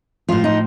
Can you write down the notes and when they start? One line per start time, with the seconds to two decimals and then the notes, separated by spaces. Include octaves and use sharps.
0.29 A2 F3 F4
0.44 D#4